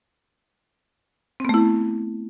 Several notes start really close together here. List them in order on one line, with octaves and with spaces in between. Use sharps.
C4 B3 A3 E4